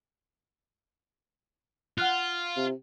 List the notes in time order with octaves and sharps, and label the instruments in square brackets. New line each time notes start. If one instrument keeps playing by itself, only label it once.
[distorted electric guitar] F4 [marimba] F#5 F6 F#6
[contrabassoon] C3